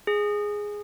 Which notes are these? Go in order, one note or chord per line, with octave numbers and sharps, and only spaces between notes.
G#4